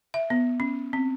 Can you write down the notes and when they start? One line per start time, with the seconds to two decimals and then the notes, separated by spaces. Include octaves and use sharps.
0.14 E5
0.30 B3
0.60 C#4
0.93 C4